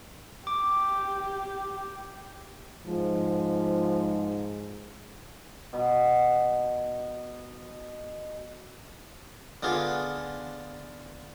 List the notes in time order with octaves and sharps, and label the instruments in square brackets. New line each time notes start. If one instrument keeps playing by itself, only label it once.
[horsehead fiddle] G4 [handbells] D6
[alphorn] G#2 [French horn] F3
[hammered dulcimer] B2 B5
[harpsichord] D3 B3 F4 G#4